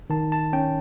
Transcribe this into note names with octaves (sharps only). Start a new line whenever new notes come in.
D#3 A5
A5
C#4 G5